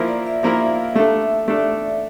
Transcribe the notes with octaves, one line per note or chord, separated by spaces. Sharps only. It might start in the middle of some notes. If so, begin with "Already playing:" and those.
Already playing: F3 A#3 E4 A#4
D5
E5
F3 A#3 E4 A#4 F5
A3 D4 A4 E5
A3 D4 A4 D5